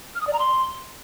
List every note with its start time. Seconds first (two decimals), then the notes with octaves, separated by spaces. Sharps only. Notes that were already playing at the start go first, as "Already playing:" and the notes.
0.15 F6
0.21 D#6
0.27 D5
0.33 A#5
0.39 C6